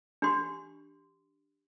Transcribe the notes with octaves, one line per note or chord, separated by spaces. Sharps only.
D4 G4 C6